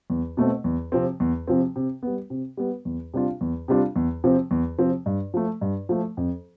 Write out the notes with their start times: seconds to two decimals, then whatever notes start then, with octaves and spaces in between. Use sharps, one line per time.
0.10 E2
0.37 B2 A3 C4
0.64 E2
0.92 C3 F3 C4
1.20 E2
1.48 C3 F3 C4
1.76 C3
2.03 G3 B3
2.30 C3
2.57 G3 B3
2.85 E2
3.14 C3 G3 D4 F4
3.41 E2
3.68 C3 G3 D4 F4
3.96 E2
4.24 C3 F3 C4
4.51 E2
4.79 C3 F3 C4
5.06 G2
5.34 F3 A3
5.61 G2
5.89 F3 A3
6.17 F2